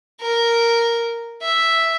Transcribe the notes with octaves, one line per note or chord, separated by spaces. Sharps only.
A#4
E5